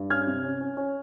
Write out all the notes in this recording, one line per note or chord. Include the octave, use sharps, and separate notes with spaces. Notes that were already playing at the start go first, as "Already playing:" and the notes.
Already playing: G2
C#4 F6 G#6
C3
C#4
C#4
C#4